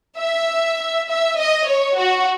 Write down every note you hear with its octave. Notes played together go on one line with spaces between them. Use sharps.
E5
E5
D#5
C#5
F#4